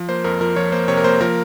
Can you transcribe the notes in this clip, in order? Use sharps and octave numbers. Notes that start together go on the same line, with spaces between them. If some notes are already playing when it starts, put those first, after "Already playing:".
Already playing: F3
A#3 C5
F2 A#4
F3 A#4
F3 C#5
A#3 C5
C3 C#5
A#4
A#3 C5
F3 A#4